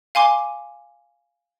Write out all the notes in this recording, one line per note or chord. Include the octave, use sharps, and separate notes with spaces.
F5 G#5 C6 D6